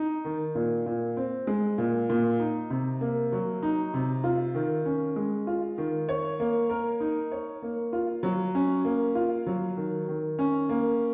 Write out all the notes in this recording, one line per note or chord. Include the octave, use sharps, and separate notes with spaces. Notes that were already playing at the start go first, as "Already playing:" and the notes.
Already playing: D#4
D#3
A#2
A#2
C4
G#3
A#2
A#2
D#4
C3
A#3
F#3
D#4
C3
F4
D#3
C#4
G#3
F4
D#3
C#5
A#3
A#4
D#4
C#5
A#3
F4
F#3
C#4
A#3
F4
F#3
D#3
D#3
C#4
A#3